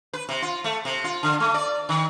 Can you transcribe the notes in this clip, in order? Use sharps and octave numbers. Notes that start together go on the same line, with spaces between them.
B4
C3
F4
A3
C3
F4
D3
A3
D5
D#3